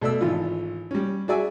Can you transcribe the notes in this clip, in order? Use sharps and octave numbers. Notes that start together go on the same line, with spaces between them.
B2 A3 D5 E6
G#1 E3 F4
G3 C#4
F#4 G#4 D5 E5 G#5